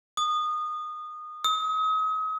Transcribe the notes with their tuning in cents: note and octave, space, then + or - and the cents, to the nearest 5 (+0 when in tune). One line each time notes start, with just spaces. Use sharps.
D#6 -20
D#6 +40